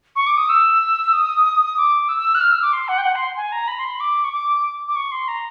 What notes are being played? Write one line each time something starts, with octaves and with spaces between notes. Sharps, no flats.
C#6
D6
D#6
E6
D#6
D6
E6
F#6
F6
E6
D6
C6
F#5
G5
F#5
C6
G#5
A#5
B5
C6
B5
D6
C#6
D6
D6
C#6
C6
A#5